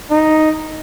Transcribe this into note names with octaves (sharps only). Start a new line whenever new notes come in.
D#4